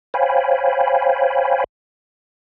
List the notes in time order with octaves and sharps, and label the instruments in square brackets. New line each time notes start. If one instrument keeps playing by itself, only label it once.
[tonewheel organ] C5 C#5 F5 G5 G#5 B5